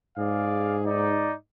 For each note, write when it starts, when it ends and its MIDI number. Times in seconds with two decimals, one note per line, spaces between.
0.18 1.37 44
0.18 0.78 68
0.18 0.78 74
0.18 0.78 77
0.87 1.34 63
0.87 1.34 74